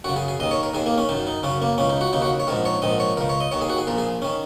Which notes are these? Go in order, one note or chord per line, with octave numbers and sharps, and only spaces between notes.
F#2 C#3 F#4
G#4
G#4
D#2 D#3 D#5
C#5
A#4
D#2 D#3 G#4
A#3
C#4
F#2 D#3 D#4
D#4
F#2 C#3 C#4
A#3
C#2 C#3 C#4
D#4
F#4
D#2 C#3 D#4
F#4
C#5
A#1 G#2 D#3 A#4
C#5
A#1 G#2 D#3 D#5
C#5
C#2 C#3 A#4
C#5
D#5
D#2 D#3 C#5
G#4
F#4
G#4
A#1 A#2 A#4
G#4
D#3 C#4